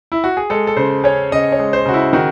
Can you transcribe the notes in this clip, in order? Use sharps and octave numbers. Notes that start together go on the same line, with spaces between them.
E4
F#4
G#4
G#3 A4
A4
C#3 C5
C#4 C#5
C#3 D#5
C#5
G#3
C5
C#3 F#4
E4
D#3 F#4